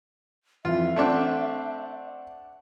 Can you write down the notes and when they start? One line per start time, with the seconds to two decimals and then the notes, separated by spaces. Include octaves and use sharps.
0.65 F2 E3 F4 E5
0.96 A3 C4 D4 D5 F#5